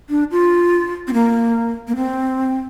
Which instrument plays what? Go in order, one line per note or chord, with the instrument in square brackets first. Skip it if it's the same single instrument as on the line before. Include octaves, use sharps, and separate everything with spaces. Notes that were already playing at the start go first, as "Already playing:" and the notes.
[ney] D4
F4
C4
A#3
A#3
C4